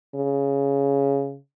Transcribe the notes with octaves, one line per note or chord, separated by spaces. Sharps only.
C#3